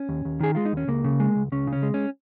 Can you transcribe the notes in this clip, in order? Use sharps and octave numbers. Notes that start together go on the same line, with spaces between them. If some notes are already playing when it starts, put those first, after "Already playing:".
Already playing: C#4
D#2
D#2
D#3 G#4
G#3 F4
D#4
D#2 C#4
C#2 A#3
C#3
G#3
C#2
C#2 C#4
C#3
C#4
G#3
C#4